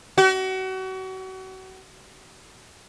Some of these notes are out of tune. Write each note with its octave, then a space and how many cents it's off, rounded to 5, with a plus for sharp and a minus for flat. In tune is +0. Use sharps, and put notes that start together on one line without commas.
F#4 +35